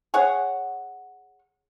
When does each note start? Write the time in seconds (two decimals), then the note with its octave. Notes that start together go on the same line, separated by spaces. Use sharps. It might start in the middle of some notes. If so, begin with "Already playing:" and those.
0.14 G#4 C#5 F#5